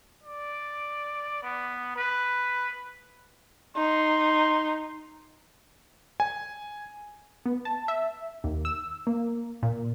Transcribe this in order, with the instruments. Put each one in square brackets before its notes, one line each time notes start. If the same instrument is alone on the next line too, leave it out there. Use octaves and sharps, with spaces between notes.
[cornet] D5
B3
B4
[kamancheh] D#4 [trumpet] C6
[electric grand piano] G#5
[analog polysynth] B3
A5
E5
D#2
E6
A#3
A#2